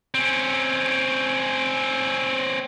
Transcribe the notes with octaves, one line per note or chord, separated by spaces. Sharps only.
C4 C#4